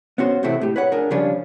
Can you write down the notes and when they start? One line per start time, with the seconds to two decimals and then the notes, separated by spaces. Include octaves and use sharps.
0.18 B3 C#4 F#4 C5
0.43 A2 C3 E3 A3 C4 E4
0.61 A2 G4
0.76 B4 C#5 F#5
0.92 D4 F4 G#4 A#4
1.10 C#3 F3 G3 C#4 D4 F4